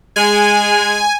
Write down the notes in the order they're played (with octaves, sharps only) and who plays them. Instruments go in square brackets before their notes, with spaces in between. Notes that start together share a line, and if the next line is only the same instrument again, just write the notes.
[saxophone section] G#3 [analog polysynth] G#5